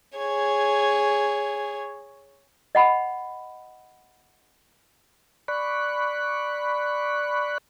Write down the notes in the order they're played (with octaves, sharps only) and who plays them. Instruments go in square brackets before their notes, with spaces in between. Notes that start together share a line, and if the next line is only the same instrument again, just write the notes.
[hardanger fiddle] G#4 C#5
[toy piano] D#5 F#5 B5
[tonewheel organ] D5 B5 C#6 F#6